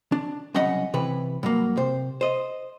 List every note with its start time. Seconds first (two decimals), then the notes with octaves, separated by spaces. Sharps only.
0.12 D4
0.54 C2 C#3 F#3 D#5 F#5 B5
0.94 C3 E3 B4
1.43 G2 F#3 A#3
1.77 C3 C5
2.21 C5 D#5